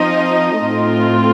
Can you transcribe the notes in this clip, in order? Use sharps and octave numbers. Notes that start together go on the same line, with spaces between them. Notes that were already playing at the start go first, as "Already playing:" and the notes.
Already playing: F3 C4 D#4 D#5
A2 A3 C4 F4